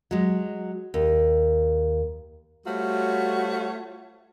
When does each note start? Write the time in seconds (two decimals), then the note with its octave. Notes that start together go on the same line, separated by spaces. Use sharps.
0.11 F#3 G#3
0.94 D#2
2.67 G3 A3 F4 F#4 C5 C#5